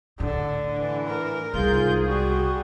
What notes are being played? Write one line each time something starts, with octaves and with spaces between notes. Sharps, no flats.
A2 D3
E3
A#4
C2 G#2 B2 F4 G#4 G6
G3 F#4